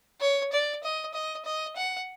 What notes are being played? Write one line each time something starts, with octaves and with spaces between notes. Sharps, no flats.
C#5
D5
D#5
D#5
D#5
F#5